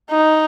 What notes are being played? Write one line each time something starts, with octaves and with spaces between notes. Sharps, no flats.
D#4